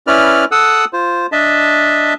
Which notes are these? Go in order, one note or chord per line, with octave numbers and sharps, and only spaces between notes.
C#4 E4 B4 D5 F6
A4 F#5 D#6 E6 F#6
F4 C5
D4 D#5 E5 A5